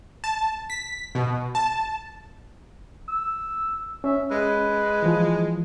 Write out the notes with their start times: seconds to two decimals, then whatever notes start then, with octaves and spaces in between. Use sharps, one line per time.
0.24 A5
0.70 B6
1.15 B2
1.55 A5
3.08 E6
4.04 C#4 E5
4.31 G#3 B4
5.03 E3 F3